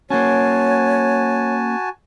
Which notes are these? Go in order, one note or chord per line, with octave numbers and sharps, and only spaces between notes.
A#3 C#4 F#4 C#5 G#5 A5